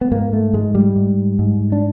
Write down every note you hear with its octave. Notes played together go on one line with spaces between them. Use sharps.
B3
G#2 A#3
A3
G#2 G#3
G3
G#2
G#2
D4